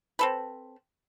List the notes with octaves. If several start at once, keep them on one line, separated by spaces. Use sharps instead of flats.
C4 A4 B4